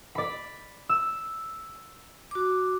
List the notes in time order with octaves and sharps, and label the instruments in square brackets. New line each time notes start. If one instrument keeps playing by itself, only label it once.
[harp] D5 B5
E6
[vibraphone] F#4 D6